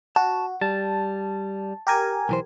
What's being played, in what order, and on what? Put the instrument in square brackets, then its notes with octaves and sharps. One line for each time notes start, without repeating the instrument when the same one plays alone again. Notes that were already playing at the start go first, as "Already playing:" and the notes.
[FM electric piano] F#4 [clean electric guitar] A5
[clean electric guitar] G3 [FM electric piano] A5
[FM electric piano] G4 A#4 G#5
[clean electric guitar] B1 E3 C5